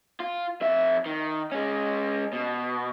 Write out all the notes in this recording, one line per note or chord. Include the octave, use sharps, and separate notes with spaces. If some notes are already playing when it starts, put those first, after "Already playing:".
F4
F2 E5
D#3
G#3 C#4
B2